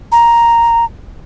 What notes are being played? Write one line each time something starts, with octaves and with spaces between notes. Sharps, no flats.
A#5